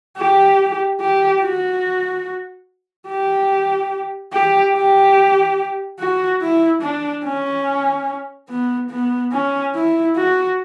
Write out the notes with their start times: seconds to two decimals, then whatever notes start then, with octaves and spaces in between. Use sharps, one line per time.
0.18 G4
1.00 G4
1.42 F#4
3.08 G4
4.33 G4
4.76 G4
5.99 F#4
6.41 E4
6.82 D4
7.25 C#4
8.49 B3
8.90 B3
9.32 C#4
9.75 E4
10.16 F#4